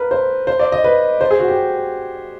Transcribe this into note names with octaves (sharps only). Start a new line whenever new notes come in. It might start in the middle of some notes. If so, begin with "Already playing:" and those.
Already playing: A#4 B4
C5
C5
D5
D#5
B4
C5
G#4
F#4
G4